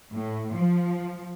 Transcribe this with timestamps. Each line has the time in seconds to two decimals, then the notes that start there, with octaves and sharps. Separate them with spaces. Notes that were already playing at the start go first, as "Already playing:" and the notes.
0.12 A2
0.56 F3